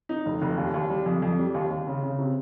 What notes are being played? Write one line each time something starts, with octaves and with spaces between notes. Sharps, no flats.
D#4
F1
F1
D#2
D#2
G3
F2
F2
G3
D#2
D#2
C#3
C#3
C3